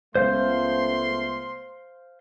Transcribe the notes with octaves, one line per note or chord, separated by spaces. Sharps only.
C#2 A3 B3 C5 F5 C6 G6